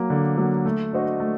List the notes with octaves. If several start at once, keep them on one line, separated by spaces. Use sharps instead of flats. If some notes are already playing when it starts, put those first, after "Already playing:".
Already playing: F#3 A#3
D3
F#3 A#3
A3
D4 F#4 C5 D#5
A3